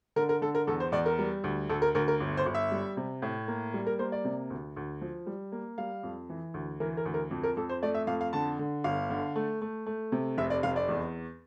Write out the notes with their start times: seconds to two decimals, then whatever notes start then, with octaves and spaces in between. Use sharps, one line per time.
0.16 D3 A#4
0.29 A#4
0.42 D3 A4
0.55 A#4
0.67 E2 A4
0.80 C5
0.92 E2 D5
1.06 A#4
1.19 G3
1.44 D2
1.69 D2 A4
1.82 A#4
1.95 D2 A#4
2.08 A#4
2.20 G1
2.37 C5
2.46 G1
2.54 E5
2.71 G3
2.97 C3
3.22 A2
3.48 A#3
3.74 G3
3.87 A#4
3.99 A#3 C5
4.12 D5
4.25 C3
4.50 D2
4.76 D2
5.01 F3
5.26 G3
5.52 A#3
5.78 G3 F5
6.03 F2
6.29 E3
6.54 D2
6.80 E3 A#4
6.97 A#4
7.05 D2
7.14 A#4
7.31 F2
7.43 A#4
7.57 F2 A4
7.69 C5
7.82 A3 D5
7.94 E5
8.07 F2 F5
8.21 F5
8.33 D3 A5
8.59 D3
8.84 G1 F5
9.10 D3
9.36 A3
9.62 A3
9.86 A3
10.12 C3
10.38 F1 E5
10.50 D5
10.63 F1 F5
10.76 D5
10.89 E2